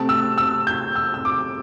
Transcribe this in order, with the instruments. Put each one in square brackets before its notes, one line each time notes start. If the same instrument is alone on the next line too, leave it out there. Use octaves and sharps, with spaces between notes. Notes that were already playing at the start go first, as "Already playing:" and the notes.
Already playing: [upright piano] C3 A3 C4 A5
E6
E6
G6
E6
E6
D6